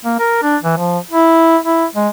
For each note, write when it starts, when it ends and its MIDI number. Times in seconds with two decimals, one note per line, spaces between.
0.05 0.15 58
0.19 0.40 70
0.42 0.57 62
0.63 0.77 52
0.78 0.99 53
1.11 1.57 64
1.65 1.86 64
1.95 2.09 56